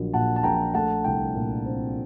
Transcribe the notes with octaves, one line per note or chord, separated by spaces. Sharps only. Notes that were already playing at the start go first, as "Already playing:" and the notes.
Already playing: A#1 F#3
A#2 F#5 A5
A5
A#1 G5 A#5
A3 F#5 A5
C2 G5
A#2
C4